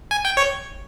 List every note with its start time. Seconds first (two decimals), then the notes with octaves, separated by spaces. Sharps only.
0.11 G#5
0.25 G5
0.37 C#5